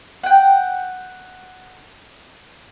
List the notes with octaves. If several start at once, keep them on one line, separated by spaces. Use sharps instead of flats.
F#5 G5